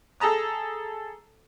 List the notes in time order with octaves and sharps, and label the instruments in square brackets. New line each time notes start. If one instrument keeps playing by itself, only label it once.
[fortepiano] G#4 A4 A5 A#5 D#6